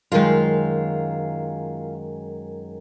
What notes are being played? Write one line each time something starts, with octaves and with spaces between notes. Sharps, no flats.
F#2 D#3 G#3 F4 F5